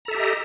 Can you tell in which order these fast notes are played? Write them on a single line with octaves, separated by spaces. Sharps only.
A#5 A4 E5 G4 D#5